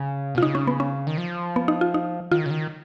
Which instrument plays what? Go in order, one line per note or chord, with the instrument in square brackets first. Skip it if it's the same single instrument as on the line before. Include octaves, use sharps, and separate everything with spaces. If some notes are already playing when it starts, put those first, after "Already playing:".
Already playing: [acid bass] C#3
B2
[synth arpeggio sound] F4
[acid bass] C#3 [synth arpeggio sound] D#4
[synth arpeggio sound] C#4
B3
C#4
[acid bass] D#3
F3
[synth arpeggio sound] B3
D#4
F4
D#4
[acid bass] D#3 [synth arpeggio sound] F4
[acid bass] C#3
D#3